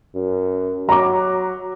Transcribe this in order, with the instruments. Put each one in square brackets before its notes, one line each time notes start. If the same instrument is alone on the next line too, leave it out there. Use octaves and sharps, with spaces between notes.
[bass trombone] F#2
[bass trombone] F#3 [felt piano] A#5 D6